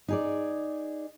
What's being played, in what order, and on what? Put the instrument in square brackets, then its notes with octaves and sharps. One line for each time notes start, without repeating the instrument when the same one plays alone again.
[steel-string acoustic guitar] D#4 G#4 D5